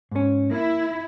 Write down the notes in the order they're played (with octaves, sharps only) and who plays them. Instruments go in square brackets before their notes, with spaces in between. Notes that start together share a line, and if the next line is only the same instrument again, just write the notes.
[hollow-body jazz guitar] G#2 C#4
[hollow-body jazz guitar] A#3 [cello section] E4